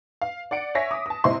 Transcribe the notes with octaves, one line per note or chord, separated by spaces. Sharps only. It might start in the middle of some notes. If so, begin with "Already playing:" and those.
F5
D5 F#5 C#7 D7
C#5 E5 G#5 A#6 B6
D6 D#6
A5 D#6
C3 C4 E4 D#5 C6